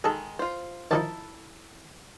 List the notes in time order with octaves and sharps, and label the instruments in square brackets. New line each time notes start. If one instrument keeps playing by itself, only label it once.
[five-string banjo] D#3 G#3 [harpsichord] G#4 A4
[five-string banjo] F4 C5
[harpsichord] D#3 F3 D#4 [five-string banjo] E4 A4 A5